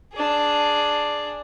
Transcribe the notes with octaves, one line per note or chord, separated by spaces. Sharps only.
D4 G#4